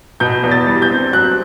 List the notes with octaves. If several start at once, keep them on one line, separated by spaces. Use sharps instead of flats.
B2 G6
E2
A6
G3
G6
C4
F#3 F#6